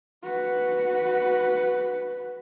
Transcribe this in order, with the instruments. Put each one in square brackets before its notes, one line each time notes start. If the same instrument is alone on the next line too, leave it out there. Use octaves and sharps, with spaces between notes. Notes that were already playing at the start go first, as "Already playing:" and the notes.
[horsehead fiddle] F#4 B4